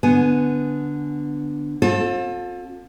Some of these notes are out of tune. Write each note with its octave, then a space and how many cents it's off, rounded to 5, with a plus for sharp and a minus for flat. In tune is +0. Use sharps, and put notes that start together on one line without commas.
D3 +0 B3 +0 G#5 +0
C4 +35 F4 +45 A4 +0